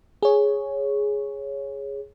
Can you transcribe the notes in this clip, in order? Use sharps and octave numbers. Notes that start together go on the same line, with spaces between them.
G#4 C#5